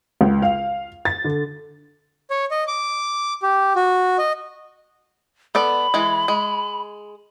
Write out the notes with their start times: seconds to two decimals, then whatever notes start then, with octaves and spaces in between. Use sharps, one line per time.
0.21 C#2
0.42 F5
1.05 A6
1.24 D3
2.30 C#5
2.51 D#5
2.68 D6
3.43 G4
3.76 F#4
4.18 D#5
5.55 B3 A4 D5 B5
5.94 E3 G#3
6.28 G#3